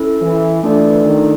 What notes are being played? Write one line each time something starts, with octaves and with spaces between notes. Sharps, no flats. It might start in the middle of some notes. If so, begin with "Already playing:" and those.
Already playing: C#4 E4 A4
E3
E3 A3 D4 F4 A4 D5
D#3